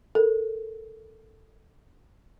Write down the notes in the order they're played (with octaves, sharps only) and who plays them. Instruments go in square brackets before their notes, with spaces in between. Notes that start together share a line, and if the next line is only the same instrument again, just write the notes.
[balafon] A4 A#4